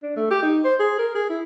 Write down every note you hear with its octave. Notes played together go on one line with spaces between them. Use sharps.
D4
A3
G4
D#4
C5
G#4
A#4
G#4
E4